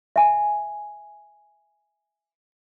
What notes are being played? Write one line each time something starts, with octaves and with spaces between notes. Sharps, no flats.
E5 G#5